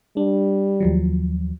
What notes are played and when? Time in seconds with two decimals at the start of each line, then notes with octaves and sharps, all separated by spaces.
0.17 G3 D4
0.80 D#2 F3 F#3